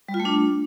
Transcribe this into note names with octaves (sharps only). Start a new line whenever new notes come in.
G3
F4
A3
D4